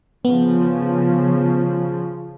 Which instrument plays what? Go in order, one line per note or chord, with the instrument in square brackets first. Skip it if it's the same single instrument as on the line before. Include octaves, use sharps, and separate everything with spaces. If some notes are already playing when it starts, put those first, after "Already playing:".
[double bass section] C#3 F3 [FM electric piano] B3